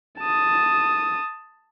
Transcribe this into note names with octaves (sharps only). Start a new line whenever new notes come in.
A5 D#6